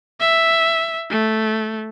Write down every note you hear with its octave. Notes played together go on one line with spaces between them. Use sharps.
E5
A3